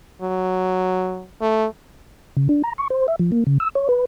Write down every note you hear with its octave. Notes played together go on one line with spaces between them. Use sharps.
F#3
A3
C#3
D4
A#5
C#6
C5
E5
F3
A#3
C#3
E6
C#5
B4